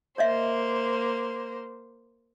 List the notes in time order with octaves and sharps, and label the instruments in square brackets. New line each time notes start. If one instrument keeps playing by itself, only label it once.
[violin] A#3 C5 [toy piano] C#5 D#5 E5